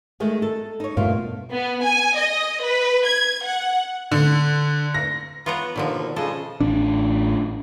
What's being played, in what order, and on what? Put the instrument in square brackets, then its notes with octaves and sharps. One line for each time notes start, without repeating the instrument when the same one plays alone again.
[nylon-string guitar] D#3 G#3 A3
A4
D#4 C#5
[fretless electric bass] G2 B2 A3 [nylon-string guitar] A#3 F4
[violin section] B3
G#5
D#5
B4
G#6
F#5
[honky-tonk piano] D3
A#6
[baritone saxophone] B3 [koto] F4 C#5 A#5
[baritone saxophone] D#2 [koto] B2 D#3 F3 [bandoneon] D3
[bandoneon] C#3 F3 [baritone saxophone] G#3 [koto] A4
[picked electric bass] A1 D4